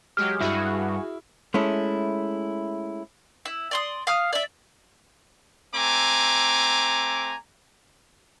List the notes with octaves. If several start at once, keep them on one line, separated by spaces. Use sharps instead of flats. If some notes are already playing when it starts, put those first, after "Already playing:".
F#3 G#3 G4 F6
G2 E4 F#4 G#4
G#3 A3 C#4 E4
E4
D5 C6 D#6
F5 D#6 F6
D5 E5
A3 C4 G#5 A#5 D6